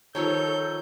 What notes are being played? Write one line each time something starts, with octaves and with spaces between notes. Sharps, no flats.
D#3 F3 G3 A4 C#5 G6